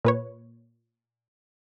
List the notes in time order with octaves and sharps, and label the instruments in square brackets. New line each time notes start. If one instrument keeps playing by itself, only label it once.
[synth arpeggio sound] A#2 B4 C#5